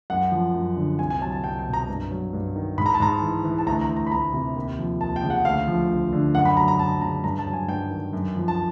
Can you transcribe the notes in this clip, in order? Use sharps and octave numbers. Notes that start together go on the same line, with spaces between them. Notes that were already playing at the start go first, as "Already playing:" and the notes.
F#2 F#5
F3
F#2
D3
C2 G#5
G#5
F#3 A5
A5
C2 G5
G5
B2
A#5
G2
F#3
G2
D#3
G#2 B5
A#5
A5
G#2 A#5
E3
E3
A5
D2 A#5
A#5
E3
A#5
B5
D2 A#5
C3
D#2
F3
D#2 A5
G5
C#3
F#5
D2 F5
F3
D2
D3
F#2 F#5
B5
F#3 A#5
A#5
F#2 A5
C#3 A#5
G2 A#5
A5
F#3
G#5
G2 G5
D#3
F#2
F3
A5